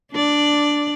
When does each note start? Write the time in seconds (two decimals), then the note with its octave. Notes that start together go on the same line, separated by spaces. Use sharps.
0.12 D4 D5